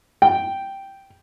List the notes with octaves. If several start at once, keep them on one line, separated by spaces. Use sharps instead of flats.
G5